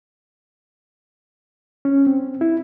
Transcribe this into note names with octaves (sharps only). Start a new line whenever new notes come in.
C#4
C4
E4